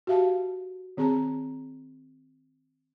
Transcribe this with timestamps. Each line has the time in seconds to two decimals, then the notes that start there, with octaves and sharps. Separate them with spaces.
0.07 F#4 G4 E5 F5 A5
0.97 D#3 C4 G#4 A5 A#5